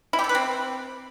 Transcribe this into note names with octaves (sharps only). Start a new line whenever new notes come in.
E4
G4
A4
B4
C4